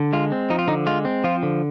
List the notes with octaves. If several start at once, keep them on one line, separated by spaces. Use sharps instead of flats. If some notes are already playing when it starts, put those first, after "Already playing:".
Already playing: D3
G#3 F4
C4
F3 D#4
F4
D3 D#4
G#3 F4
C4
F3 F4
D3